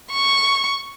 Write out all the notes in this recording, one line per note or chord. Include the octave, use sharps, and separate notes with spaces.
C#6